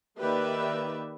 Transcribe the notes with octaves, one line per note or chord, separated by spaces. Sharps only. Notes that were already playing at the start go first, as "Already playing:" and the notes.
D#3 A#3 G4 B4 D5 E5